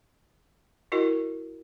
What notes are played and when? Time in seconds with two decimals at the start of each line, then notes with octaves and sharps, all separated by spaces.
0.92 E4 F#4 A#4 D#5